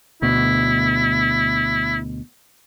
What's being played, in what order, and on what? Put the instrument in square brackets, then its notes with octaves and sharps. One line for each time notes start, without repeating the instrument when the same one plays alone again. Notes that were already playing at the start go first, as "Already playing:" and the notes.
[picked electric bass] D2 B2 [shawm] E4